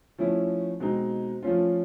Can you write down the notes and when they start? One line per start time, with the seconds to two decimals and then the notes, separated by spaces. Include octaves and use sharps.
0.18 F3 A3 C#4 E4
0.80 B2 G#3 C4 D#4
1.43 F3 A3 C#4 F4